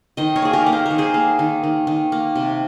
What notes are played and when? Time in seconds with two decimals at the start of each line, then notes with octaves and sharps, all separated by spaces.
0.17 D#3 C5 D#5
0.36 A#4 C#5
0.42 A#3 G#4
0.53 G4 A#4
0.66 A#3
0.73 C5
0.86 D#3 A#4
0.98 G#4 C5
1.14 A#3
1.39 D#3
1.64 D#3
1.87 D#3
2.12 A#3
2.35 C3